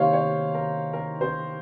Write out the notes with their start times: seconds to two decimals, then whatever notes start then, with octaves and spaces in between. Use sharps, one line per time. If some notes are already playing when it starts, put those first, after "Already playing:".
Already playing: C3 D#3 A#3 D#4 C5 C#5 F5
0.13 C#5
0.54 A#4
0.93 A#4
1.21 C5